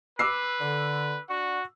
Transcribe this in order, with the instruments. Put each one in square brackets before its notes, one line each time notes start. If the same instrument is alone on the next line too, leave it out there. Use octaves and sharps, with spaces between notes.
[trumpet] B4 [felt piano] D6 E6 C7
[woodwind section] D3
[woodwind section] D4 F#5 C#6 [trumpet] F#4